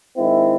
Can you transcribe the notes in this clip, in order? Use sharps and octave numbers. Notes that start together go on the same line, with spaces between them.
D#3 G#3 C4 E4